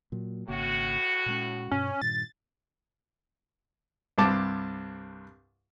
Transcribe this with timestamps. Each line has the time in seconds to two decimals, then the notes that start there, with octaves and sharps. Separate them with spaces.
0.12 A#2 F#3
0.48 G#1 A2 C#3 A#3 F#4
1.26 A#2 G#3 C#4
1.71 G2 B2 C#4
2.02 G2 A#2 D#3 A6
4.18 C2 G2 C4 A5 D6